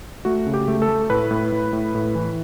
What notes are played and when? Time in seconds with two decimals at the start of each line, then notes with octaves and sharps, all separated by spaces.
0.25 A3 F#4
0.47 C#3
0.54 G4
0.68 A3
0.82 A4
0.89 A3
1.10 A2 B4
1.31 A2
1.52 A2
1.73 A2
1.95 A2
2.15 E3